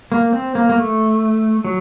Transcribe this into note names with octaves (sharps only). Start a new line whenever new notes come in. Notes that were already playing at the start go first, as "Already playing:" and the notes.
A#3
C4
A#3
A#3
A3
F#3